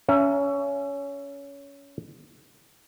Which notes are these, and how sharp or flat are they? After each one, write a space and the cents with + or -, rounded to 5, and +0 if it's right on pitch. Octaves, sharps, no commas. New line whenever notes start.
C#4 +20 E5 +35 A#5 +0